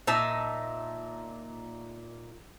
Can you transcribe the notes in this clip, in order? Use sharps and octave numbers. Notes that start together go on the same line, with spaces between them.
A#2 D#4 E5 A5